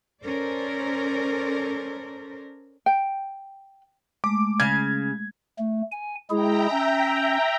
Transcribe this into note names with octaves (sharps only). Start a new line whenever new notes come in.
C#4 A4 A#4 C5 D5
G5
G#3 A3 D6
C#3 F5 G#6
A3
G#5
G#3 E4 G#4 E5 G5 A#5
C#4